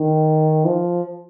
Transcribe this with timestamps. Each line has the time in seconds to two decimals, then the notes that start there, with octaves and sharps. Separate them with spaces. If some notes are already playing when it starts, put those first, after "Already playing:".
Already playing: D#3
0.65 F3